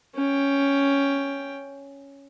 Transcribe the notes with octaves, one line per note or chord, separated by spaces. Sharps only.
C#4 G5